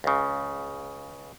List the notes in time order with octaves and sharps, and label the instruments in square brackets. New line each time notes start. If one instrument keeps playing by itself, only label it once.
[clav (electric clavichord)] C#2 C#3